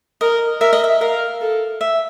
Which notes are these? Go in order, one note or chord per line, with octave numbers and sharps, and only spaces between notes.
A#4 D#5
A#4 E5
D#5
E5
A#4 F5
A4
E5